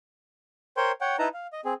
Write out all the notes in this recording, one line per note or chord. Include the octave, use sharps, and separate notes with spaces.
A#4 C5 C#5 G5 C6
C#5 F#5 G5
D#4 E4 B4 D#5 A5 A#5
F5
D#5
C4 G#4